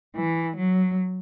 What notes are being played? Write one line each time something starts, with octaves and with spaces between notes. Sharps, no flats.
E3
F#3